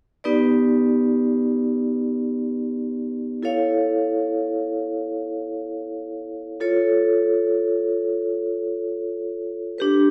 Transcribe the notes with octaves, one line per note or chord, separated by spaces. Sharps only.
B3 D#4 G4 B4 D5
E4 A4 C#5 F5
F4 A4 C#5
D4 G4 B4